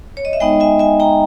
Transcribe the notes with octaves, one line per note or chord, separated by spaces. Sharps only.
C#5
D#5
E5
G#3 B3 D#4 D#5 G5
E5 G#5
E5 G#5
G5 A#5